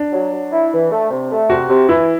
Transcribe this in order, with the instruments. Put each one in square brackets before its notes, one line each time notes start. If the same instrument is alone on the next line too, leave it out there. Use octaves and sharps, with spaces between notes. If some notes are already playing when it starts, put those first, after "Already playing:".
Already playing: [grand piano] D4
[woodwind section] F#3
F#3
E4
E3
A3
C3
A3
[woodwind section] C3 [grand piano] F#4
[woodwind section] C3
[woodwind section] E3 [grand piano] E4